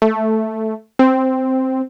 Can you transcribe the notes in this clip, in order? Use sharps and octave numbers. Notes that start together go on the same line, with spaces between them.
A3
C4